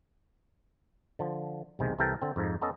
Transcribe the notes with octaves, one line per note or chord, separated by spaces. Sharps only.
D3 F3
B1 E2 C3 D#3 G#3
C2 C3 E3 A4 A#4 G5
D3 C4
F2 G#2 F3 D#4
B3 C#4 A4 D#5